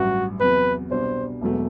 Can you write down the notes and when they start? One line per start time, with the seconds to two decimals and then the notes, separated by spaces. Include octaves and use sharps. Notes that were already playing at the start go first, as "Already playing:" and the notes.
Already playing: A1 G2 F#3 F#4
0.40 E2 C3 F#3 B4
0.91 C2 B2 G3 D4 C5
1.41 E1 E2 B2 F#3 A3